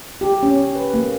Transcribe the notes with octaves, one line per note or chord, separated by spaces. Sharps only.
G4
C#4
B4
A#3